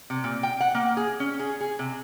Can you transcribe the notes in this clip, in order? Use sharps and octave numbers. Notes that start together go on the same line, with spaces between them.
C3
A#2
G5
F#5
A#3
G#4
C#4
G#4
G#4
C3